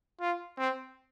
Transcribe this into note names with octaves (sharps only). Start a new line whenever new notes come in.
F4
C4